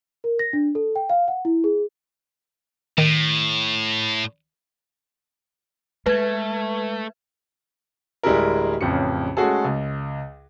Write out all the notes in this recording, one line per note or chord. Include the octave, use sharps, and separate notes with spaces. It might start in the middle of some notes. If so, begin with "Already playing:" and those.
A#4
A#6
D4
A4
G5
F5
F#5
E4
G#4
A2 D#3
G#3 A3 B4 G#6
D1 G3 G#3 E4 A#4
A1 F2 C#3 C#7
G#3 A3 C#4 F#4 G#4 A4
C#2